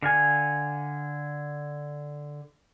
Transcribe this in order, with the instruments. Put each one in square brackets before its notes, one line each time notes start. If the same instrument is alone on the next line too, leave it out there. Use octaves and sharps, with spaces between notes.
[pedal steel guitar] D3 F5 G#5